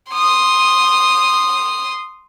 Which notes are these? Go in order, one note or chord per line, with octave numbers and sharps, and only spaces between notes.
C6 D#6